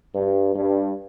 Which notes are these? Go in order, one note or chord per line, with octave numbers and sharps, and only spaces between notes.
G2
G2